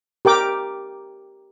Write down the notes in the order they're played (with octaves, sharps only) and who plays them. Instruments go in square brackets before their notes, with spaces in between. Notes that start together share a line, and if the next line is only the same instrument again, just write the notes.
[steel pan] G4 A#4 G5 D6